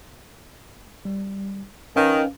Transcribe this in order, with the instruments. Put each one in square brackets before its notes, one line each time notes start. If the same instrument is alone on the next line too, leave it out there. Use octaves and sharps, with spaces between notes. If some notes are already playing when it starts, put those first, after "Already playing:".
[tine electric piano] G3
[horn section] D#3 [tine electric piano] C#4 B4 F5